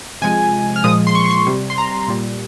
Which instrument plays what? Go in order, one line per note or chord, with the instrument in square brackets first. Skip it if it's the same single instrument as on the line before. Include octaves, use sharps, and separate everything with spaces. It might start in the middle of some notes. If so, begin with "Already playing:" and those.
[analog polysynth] C3 F3 G#3 G#5
F6
A#2 F3 G#3 D#6
C6
C#6
C#6
C6
C3 G3
C6
A#5
A#2 G3